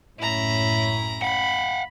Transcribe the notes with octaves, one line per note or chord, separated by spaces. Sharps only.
F#1 A2 C#4 E4 A#5
F5 F#5 B5